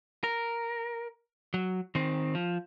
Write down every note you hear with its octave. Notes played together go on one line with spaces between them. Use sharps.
A#4
F#3
D#3 C4
F3